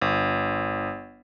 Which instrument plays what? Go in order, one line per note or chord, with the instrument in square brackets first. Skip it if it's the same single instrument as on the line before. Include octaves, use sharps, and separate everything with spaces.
[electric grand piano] G1